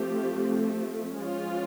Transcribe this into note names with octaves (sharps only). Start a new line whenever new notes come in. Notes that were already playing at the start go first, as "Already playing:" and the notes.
Already playing: F3 A3 C4 G4
F3 G#3 C#4 F4